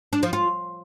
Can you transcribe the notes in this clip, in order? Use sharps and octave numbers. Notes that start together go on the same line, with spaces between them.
D4
F3
F4